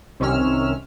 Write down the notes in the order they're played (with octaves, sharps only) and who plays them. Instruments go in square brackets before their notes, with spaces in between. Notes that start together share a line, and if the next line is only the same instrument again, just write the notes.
[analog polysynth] C2 C3 D#3 C#4 E6 F6